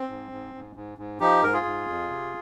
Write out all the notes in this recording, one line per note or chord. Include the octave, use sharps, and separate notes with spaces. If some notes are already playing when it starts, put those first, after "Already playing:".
Already playing: C4
G#2
G#2
G#2
G#2
G#2
F3 D#4 G4
G#2 A#4
F4 G#4
G#2
F2
C3